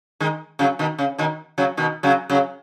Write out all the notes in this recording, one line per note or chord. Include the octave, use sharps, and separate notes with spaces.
D#3 G#3
C#3 F#3
B2 D#3
C#3
B2 D#3
C#3 F#3
B2 D#3
C#3 F#3
C#3 F#3